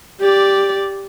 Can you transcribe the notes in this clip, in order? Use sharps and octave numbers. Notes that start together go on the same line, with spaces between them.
G4 D5